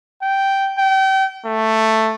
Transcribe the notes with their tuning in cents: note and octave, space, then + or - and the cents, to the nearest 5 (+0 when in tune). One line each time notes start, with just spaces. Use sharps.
G5 -5
G5 -30
A3 +5